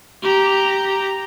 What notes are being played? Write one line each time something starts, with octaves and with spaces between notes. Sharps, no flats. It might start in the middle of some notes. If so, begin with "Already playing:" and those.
G4 A#5